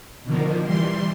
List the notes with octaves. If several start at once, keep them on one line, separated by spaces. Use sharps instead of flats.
B2 D3 D#3 F3 A#3
E3 G3 C6